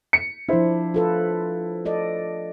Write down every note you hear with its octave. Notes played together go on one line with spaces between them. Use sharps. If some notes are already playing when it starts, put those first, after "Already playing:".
C#7
F3 D4 E4 C5
F4 A4 B4
A4 D5 D#5